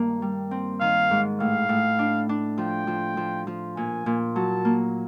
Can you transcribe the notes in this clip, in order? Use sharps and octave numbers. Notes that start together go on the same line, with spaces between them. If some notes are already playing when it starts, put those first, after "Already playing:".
Already playing: G2 D#3 A#3
G3
C4
D#3 F5
G#2
A2 F5
A2
D4
D4
F3 G5
F3
F3
F3
A#2 G#5
A#2
F#3 A5
A#3